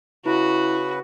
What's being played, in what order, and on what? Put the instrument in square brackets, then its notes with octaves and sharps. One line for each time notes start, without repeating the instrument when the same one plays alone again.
[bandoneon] C#3 B4 [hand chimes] E4 [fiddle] F#4